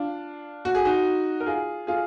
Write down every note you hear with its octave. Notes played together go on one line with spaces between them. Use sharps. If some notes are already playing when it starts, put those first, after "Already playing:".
Already playing: D4 F4
F#4
G#4
D#4 F#4
A#4
F4 G#4
F4 G#4